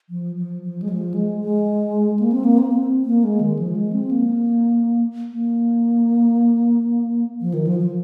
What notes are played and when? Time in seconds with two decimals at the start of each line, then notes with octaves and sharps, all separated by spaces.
0.10 F3
0.36 F3
0.62 F3
0.82 G#3
0.89 F3
1.14 G#3
1.40 G#3
2.19 A#3
2.32 C4
2.44 A#3
2.58 C4
2.72 C4
3.06 A#3
3.24 G#3
3.41 D#3
3.59 F3
3.76 G#3
3.92 C4
4.11 A#3
5.32 A#3
7.41 F3
7.54 D#3
7.67 F3
7.80 F3